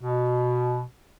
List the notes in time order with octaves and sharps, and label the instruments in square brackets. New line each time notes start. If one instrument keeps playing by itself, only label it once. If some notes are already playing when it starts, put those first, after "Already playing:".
[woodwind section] B2